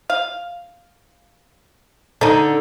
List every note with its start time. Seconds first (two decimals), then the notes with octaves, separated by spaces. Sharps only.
0.10 F5
2.21 D3 D4 D#4